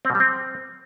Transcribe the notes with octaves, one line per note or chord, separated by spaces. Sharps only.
C4
B2
G3
C4